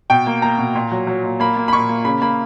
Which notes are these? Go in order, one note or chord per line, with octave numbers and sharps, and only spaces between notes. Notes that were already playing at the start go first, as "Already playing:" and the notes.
B2 G5
A#3
A#3 A#5
B2
A#2
F#3
F#3
A#2
A#3 B5
A#3
B5
A#2 C#6
A#3
C#3 B5
A#3 B5